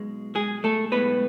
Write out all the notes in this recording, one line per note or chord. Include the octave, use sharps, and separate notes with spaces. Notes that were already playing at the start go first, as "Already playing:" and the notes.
Already playing: B1 B2 G#3
G#3 G#4
A3 A4
B1 A2 G#3 B3 B4